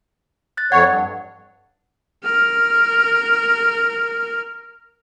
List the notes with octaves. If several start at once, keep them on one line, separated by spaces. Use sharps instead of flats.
F#6 A6
F2 C#5 F#5
G2
A#4 F6